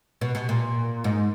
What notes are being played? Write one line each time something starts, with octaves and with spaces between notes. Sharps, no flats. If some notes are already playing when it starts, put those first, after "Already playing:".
B2
B2
A#2
G#2